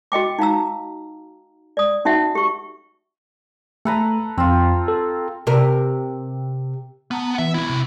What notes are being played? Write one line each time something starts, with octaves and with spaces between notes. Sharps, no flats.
F#4 D#5 G5 D6
D#4 F5 A#5 E6
D5 D#6
C#4 D#4 F#4 E5 F#5
G4 C#6
A3 A4 B4 A#5
F2 C4 F4
A4
C3 A#4
B3 A5 A#5
E3 B3 E5
B1 E4
C3